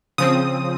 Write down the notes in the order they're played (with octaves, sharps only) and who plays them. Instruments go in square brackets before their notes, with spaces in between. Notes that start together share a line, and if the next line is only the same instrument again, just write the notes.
[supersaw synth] C#3 F3 C4 D#6